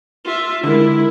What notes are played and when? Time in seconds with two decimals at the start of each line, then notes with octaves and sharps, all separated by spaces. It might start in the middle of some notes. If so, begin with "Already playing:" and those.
0.25 F4 E5
0.64 D3 G#3 E4 A#4